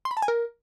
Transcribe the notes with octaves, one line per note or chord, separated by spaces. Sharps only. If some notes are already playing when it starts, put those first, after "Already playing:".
C6
B5
A5
G#5
A#4